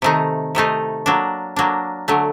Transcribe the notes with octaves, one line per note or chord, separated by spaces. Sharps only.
C3 D#3 A3 D#4
C3 D#3 A3 D#4
F#3 A#3 D4
F#3 A#3 D4
D3 F#3 A3